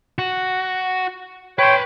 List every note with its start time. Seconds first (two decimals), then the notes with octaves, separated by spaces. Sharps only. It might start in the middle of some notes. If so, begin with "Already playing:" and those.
0.18 F#4
1.59 B4 C#5 G5 C6